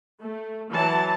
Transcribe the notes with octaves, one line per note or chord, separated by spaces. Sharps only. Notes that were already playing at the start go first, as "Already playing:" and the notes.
A3
E3 F#3 A5